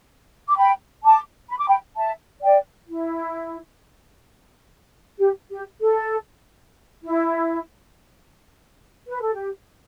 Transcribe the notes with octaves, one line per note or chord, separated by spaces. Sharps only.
D6
G5 B5
A5 D6
B5
D6
G5 B5
E5 A5
D5 G5
E4
G4
G4
A4
E4
B4
A4
G4